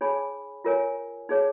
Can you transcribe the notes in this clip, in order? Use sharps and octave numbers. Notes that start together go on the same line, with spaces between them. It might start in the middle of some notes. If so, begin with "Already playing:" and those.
D#4 G#4 C#5 G#5 B5
F4 A#4 C#5 G#5
D#4 G#4 C#5